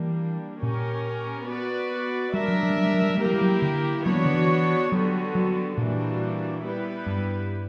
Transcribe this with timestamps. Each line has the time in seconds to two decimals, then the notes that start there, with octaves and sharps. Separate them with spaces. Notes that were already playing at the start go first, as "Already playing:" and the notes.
Already playing: E3 G3 A#3 D4
0.62 A#2 C#4 G4 A#4
1.48 B3 F#4 B4 D5
2.33 G3 D4 A#4 E5
2.48 F#3
2.63 F#3
2.70 G3
2.78 F#3
2.87 G3
2.94 F#3
3.02 G3
3.10 F#3
3.18 G3 A#3 E4 G4 A#4
3.26 F#3
3.34 G3
3.42 F#3
3.62 D3
4.06 F#3 B3 D4 F#4 C#5
4.15 E3
4.25 D3
4.34 E3
4.91 D3 F#3 G3 B3 F#4
5.35 F#3
5.77 A#2 E3 G3 A#3 D4 F#4
6.64 G3 B3 E4 G4 B4
7.06 G2